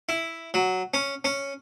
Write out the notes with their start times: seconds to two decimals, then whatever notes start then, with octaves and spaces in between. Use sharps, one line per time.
0.09 E4
0.54 F#3
0.94 C#4
1.24 C#4